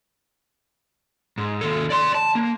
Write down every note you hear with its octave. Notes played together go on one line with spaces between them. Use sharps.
G#2
D#2 A4
D5 C6
A5
A#3